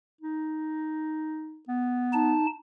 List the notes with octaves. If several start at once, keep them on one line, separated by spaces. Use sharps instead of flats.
D#4
B3
D#4 A5